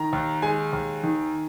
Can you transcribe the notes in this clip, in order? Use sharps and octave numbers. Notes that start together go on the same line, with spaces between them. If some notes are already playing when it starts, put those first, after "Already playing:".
Already playing: D#3 A#5
D#2
G#3 G#5
D#2
D#3